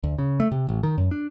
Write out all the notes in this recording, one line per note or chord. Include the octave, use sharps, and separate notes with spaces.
D2
C#3
A3
C3
A1
D#3
F#2
D4